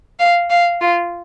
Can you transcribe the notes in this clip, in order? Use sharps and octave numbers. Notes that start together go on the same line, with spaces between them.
F5
F5
F4